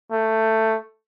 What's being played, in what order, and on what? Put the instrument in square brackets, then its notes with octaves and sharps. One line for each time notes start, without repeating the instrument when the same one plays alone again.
[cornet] A3